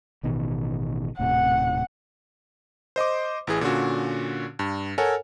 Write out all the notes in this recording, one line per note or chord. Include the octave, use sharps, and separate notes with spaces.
A1 B2 D#3
D#1 A2 C3 F#5
C5 D#5 C6 D6
A1 E3 G#4
A#2 D3 C#4 F#4
G2
A4 A#4 C#5 F#5 G#5